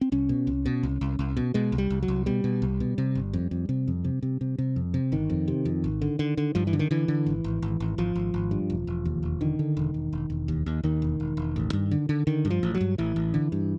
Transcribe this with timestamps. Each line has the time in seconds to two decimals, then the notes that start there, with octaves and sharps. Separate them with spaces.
0.01 C4
0.12 C2 C#4
0.29 B2
0.47 C2
0.66 B2
0.83 C2
1.01 C2
1.19 C2
1.37 B2
1.54 B2 G#3
1.72 C2
1.78 G3
1.90 C2
2.03 F#3
2.08 C2
2.26 B2 G3
2.44 B2
2.62 C2
2.80 B2
2.98 C3
3.15 G1
3.33 F2
3.51 F2
3.69 C3
3.88 F2
4.05 C3
4.23 C3
4.41 C3
4.58 C3
4.76 F2
4.94 C3
5.12 G1 D#3
5.30 F2
5.48 C3
5.65 F2
5.84 G#1
6.02 D3
6.19 D3
6.37 D3
6.55 G2 F3
6.67 E3
6.73 D3
6.79 D#3
6.91 D3 E3
7.08 D3
7.26 G#1
7.44 G#1
7.62 G#1
7.80 G#1
7.98 G#1 F3
8.16 G#1
8.34 G#1
8.51 G2
8.70 E1
8.87 E1
9.05 D#2
9.23 E1
9.41 D3 D#3
9.59 D3
9.77 E1
9.94 E1
10.13 E1
10.30 E1
10.48 D#2
10.66 D#2
10.83 D#2 D#3
11.02 E1
11.20 E1
11.37 E1
11.56 A1
11.73 G2
11.91 D3
12.09 D3
12.27 D3 D#3
12.45 G2
12.50 F3
12.63 A1
12.75 F#3
12.81 G2
12.98 A1 E3
13.16 A1
13.34 D3
13.52 G2